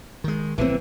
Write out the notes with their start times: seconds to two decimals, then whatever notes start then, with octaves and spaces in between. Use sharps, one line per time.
0.24 D#3 G#3
0.58 A#1 D3 E3 C4